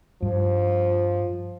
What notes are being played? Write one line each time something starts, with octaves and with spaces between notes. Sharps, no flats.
G2 F3